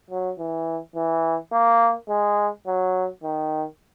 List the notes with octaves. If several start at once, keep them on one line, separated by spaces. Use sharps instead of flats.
F#3
E3
E3
A#3
G#3
F#3
D#3